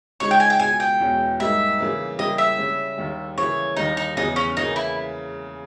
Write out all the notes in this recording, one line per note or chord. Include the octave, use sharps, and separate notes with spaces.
C#2 C#3 G#3 D#4 C#5
G5
G#5
G5
C#2 B2 G#3 G#5
G5
E2 B2 G#3 C#4 E4
G#2 G3 A#3 D#4 G4 E5
C#3 E3 A#3
C#3 G3 A#3 E4 G4 D#5
E5
C#3 G3 C#4
D#2 D#3 G3
C#3 E3 A#3 E4 C#5
D#2 D#3 G3 D#4
D#4
E2 C#3 E3 D#4
C#4
C#3 E3 A#3 D#4
E4